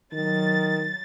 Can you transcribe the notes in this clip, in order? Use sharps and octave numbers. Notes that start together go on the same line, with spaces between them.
D#3 F#3 A6